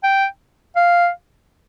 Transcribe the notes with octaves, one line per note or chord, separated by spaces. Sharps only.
G5
F5